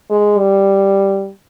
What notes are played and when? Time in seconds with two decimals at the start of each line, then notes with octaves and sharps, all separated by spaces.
0.10 G#3
0.39 G3